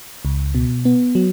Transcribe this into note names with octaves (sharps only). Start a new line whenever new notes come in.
C#2
B2
B3
F#3